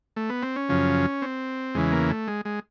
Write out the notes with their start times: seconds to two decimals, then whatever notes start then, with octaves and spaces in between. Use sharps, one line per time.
0.16 A3
0.30 B3
0.43 C4
0.56 C#4
0.69 F#2 C#3 F3
1.22 C4
1.75 E2 C#3 E3 G#3
1.92 A#3
2.10 A3
2.28 G#3
2.45 G#3